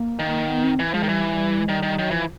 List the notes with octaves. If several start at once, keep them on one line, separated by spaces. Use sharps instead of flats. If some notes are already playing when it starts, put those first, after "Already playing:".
Already playing: A#3
D#3
B3
C4
E3
F3 G#3
D#3
E3 G3
G#3
D#3 G3
D#3
D#3 F#3
E3 F3